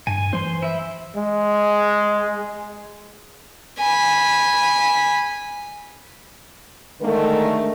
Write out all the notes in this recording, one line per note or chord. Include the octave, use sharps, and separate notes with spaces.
G2 G#5
E3 C5 C6
E4 E5
G#3
G#5 B5
D3 D#3 G#3 A3 A#4